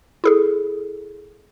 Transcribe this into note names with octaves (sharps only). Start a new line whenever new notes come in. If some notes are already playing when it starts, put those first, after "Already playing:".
E4 G#4 A4